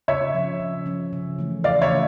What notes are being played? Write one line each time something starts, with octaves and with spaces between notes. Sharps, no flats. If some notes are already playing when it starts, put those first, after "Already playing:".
C#3 C#5 E5
F3 C#4
C#3
F3 C#4
C#3
E3 A3 C#4
C#3 D5 F5
C#5 E5
E3 A3 C#4